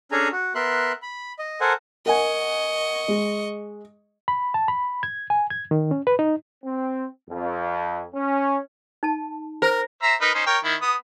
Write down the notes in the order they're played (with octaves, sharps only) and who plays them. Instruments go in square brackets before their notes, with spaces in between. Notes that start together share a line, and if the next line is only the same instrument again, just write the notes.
[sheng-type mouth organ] C#4 D4 G#4 A4 G#5 A#5
F#4
B3 A#4 E5 C6 F#6
B5
D#5
A4 A#4 C5 F#5 G#5
[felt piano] A#4 F#5 G#5 [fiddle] D#5 C#6
[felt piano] G#3
[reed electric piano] B5
A5
B5
G#6
G#5
G#6
D#3
C#4
B4
D#4
[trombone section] C4
F2
C#4
[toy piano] D#4 A5
[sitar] A#4 [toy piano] C5
[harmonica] C5 E5 A#5
D#4 A#4 B4
C#4 D#4 C5
A#4 C#5 G5
D#3 E4
B3 D#6